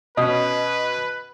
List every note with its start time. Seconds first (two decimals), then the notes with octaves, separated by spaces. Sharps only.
0.17 B2 C#4 B4 D#5